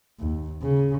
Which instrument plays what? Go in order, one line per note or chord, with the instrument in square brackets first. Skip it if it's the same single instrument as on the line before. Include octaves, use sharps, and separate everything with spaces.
[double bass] D#2
C#3